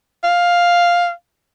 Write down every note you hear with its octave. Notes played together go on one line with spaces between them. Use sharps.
F5